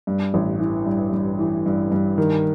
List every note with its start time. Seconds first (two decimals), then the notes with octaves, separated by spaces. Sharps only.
0.07 G2
0.34 A1
0.60 E3
0.86 G2
1.12 G2
1.39 E3
1.66 G2
1.92 G2
2.18 D#3